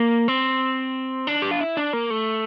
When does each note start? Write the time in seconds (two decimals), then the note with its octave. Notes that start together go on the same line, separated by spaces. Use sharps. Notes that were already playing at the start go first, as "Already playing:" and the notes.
Already playing: A#3
0.28 C4
1.27 D4
1.42 G4
1.51 F4
1.61 E4
1.77 D4
1.93 A#3
2.10 A3